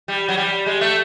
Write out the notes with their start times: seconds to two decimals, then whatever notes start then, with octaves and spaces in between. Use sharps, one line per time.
0.08 G3
0.29 F#3
0.37 G3
0.66 G#3
0.81 A3